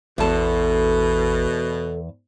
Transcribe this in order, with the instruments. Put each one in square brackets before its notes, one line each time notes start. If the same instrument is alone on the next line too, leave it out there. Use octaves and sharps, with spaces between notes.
[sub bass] A1 [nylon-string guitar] E2 A5 [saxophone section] B2 [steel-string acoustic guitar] A4 C5